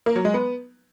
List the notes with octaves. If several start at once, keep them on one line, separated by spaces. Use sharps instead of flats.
A#3
F#3
G#3
B3